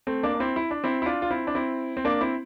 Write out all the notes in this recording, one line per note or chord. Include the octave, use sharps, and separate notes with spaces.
A3 C4
A#3 D4
D4
C4 E4
E4
D4
C4 E4
E4
D4 F4
F4
C4 E4
D4
C4 E4
C4
A#3 D4
C4 E4